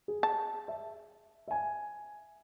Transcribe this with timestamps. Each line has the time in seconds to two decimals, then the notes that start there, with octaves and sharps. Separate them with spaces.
0.08 G#4
0.23 A5
0.68 E5
1.48 E5 G#5